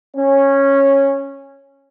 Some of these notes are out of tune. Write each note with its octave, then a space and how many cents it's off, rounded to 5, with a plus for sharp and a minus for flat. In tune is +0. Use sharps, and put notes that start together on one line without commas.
C#4 -10